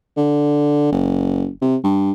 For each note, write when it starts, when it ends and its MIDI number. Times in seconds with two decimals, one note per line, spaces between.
0.17 0.90 50
0.92 1.49 30
1.61 1.76 48
1.84 2.12 43